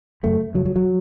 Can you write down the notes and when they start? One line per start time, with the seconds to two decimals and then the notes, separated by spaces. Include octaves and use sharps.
0.23 F#2 C#3 A3
0.54 F#2 C#3 F#3
0.66 F#3
0.76 F#3